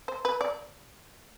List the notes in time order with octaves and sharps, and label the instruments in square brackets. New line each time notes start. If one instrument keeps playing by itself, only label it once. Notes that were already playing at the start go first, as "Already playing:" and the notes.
[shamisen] C5
B4
D5